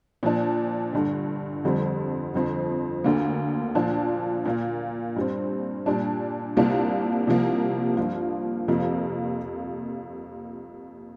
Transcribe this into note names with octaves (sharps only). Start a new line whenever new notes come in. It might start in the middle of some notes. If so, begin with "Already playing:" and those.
A#2 F3 D4
G1 G2 D3
G1 F2 D3 G3 C4
G1 F2 F3 C4
D2 D3 A#3
A#2 F3 D4 F4
A#2 A#3 F4
G2 G3 C4
A#2 G3 D4
C2 C3 A#3 D4 F4
C2 C3 F3 A#3
G2 F3 A#3 F4
F2 C3 A#3 F4